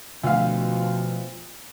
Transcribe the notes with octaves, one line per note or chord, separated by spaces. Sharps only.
D2 B2 F3 F5